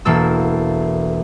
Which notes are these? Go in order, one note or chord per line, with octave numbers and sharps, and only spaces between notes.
E1 A#3 A4 E6